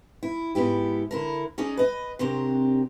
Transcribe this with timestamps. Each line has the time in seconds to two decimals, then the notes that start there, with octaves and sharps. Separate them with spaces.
0.23 E4
0.55 G#2 B3 E4 G4
1.11 D3 E4 A#4
1.58 C#4 D#4 G#4 D5
1.77 B4 D#5
2.19 C3 F#3 C4 D4 G4 A#4